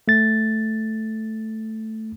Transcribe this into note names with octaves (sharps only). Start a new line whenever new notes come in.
A3 A6